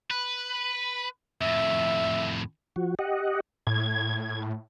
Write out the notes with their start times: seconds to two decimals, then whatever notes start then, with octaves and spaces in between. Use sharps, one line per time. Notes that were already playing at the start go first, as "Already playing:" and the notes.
0.11 B4
1.41 F2 A2 E5
2.76 F3 F#4
2.99 G4 D#5 F#5
3.67 A2 G#6